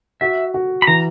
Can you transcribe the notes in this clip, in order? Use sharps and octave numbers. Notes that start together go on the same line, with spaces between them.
F#4 E5
F#4
B5
E3 A#5